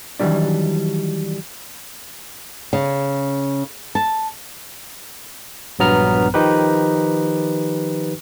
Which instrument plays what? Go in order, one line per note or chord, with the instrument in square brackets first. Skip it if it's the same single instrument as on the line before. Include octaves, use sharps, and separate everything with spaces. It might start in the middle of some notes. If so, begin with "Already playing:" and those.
[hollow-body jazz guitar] D#3 E3 F#3 G3 D4
[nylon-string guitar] C#3
A5
[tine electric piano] A#1 G2 F#3 B3 A#5 F6
D#3 F3 D#4 G4 B4